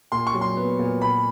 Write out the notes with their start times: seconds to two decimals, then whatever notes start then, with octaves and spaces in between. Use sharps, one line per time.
0.12 A#2 C6
0.27 C#6
0.34 F#3
0.41 C6
0.57 B3
0.79 A#2
1.01 A#2 B5